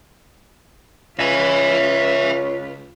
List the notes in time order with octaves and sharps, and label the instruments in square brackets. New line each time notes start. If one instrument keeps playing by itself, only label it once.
[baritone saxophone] C#2 [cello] F4 B4 [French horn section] C#5 [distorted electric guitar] E5 G#5